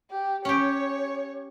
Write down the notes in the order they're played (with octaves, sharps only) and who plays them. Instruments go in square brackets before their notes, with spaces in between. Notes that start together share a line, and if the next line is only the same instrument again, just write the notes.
[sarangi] G4
[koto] C#4 G4 [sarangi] C#5